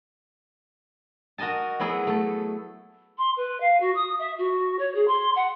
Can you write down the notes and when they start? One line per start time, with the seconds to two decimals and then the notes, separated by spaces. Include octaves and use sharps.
1.38 F#4 A#4 D#5 G#5 A5
1.80 F#3 B3 E4 G#4
2.07 A3 A4
3.18 C6
3.36 B4
3.60 F5
3.80 F#4
3.95 D#6
4.19 E5
4.38 F#4
4.79 C#5
4.95 G#4
5.07 C6
5.35 F#5